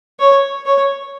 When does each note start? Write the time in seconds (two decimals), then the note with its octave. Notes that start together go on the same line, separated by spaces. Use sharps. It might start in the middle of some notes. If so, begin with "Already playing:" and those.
0.19 C#5
0.66 C#5